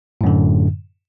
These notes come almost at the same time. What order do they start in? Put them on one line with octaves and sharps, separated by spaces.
A2 F#2 D3